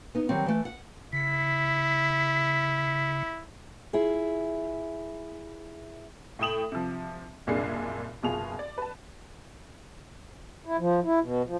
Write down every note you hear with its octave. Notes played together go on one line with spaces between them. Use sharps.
B3 D#4
D#3 F#3 G3 C4
E3 A3
F#5
C#3 E4 B6
E4 F4 G#4
A2 A3 G5 D#6 E7 F#7
C3 F3
F#1 C2 A#2 D4 G#4 C7
F#1 B2 F4 G#4 F7
D5
B4 A5
E4
F3
E4
B2
F3